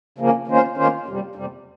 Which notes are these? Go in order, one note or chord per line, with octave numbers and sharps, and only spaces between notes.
C#3 F3 A#3 C#4
D#3 A#3 C#4 F4 C5
D#3 A#3 C#4 F4 C5
F2 C3 G3
F2 C3 G3